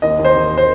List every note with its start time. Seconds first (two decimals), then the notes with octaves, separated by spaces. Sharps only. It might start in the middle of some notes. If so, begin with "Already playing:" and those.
0.02 D#2 D#5
0.19 D#2
0.25 C5
0.36 D#2
0.51 A#3
0.58 C5